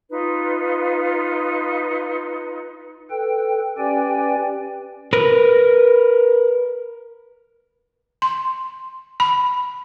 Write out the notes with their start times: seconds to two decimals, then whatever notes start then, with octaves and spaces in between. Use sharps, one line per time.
0.10 D#4 F4 B4
3.10 A4 B4 G5
3.78 C#4 G4 B4 D5 G5 G#5
5.13 A#4 B4
8.22 C6
9.20 B5